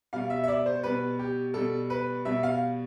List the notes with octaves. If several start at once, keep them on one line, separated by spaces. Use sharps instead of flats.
B2 G3 F5
E5
E5
D5
C5
B2 G3 B4
G4
B2 G3 A4
B4
B2 G3 E5
F5